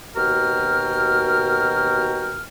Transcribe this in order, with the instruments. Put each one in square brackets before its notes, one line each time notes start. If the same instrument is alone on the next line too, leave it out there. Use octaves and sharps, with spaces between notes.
[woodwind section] D#2 B2 F#4 A#4 G5 F6